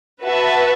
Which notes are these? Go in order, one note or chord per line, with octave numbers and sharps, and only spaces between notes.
F#4 B4 E5 A5